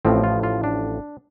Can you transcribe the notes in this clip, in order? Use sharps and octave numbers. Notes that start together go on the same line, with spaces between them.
A1 A2 F3 C4
F4
F4
D4